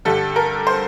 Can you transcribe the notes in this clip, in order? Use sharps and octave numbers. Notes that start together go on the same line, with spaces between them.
G2 D3 G3 A4
A#4
C5